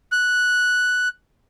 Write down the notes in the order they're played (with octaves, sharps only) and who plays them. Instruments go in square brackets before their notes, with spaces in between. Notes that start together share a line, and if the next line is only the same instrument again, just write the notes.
[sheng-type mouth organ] F#6